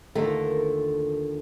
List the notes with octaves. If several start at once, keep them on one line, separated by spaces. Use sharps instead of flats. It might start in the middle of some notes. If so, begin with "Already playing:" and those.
D#2 D3 F3 A3 A#4